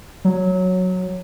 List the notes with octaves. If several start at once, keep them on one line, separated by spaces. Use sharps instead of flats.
F#3